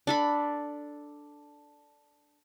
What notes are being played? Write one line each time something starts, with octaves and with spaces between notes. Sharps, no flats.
D4 A4 B5